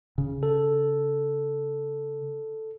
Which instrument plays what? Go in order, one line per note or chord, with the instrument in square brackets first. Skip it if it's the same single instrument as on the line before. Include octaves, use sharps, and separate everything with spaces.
[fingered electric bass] C#3
[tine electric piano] A4